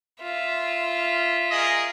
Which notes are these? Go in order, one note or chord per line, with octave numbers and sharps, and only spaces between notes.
F4 E5
G#4 A#4 D#5